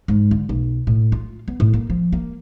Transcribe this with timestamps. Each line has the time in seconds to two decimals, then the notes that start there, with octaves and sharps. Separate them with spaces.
0.08 G#2
0.31 D3
0.49 B1
0.87 A2
1.12 F4
1.48 B3
1.60 A2
1.73 A#3
1.90 F3
2.13 A#3